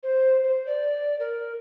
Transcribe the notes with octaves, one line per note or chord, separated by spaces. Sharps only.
C5
C5
D5
A#4